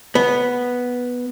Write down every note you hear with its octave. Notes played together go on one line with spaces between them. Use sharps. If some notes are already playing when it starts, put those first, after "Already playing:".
B3